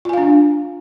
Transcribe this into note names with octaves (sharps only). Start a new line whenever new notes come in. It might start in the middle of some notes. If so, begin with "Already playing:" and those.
D4 F4 F5 G#5